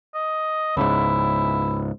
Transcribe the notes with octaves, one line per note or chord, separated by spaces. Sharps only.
D#5
C#2 G#2 E4